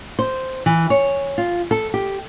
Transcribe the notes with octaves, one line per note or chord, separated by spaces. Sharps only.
C5
E3
C#5
F4
A4
G4